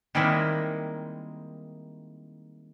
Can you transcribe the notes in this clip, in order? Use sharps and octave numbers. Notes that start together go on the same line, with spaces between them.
D#3 G3 G#3 A#3 C4 E4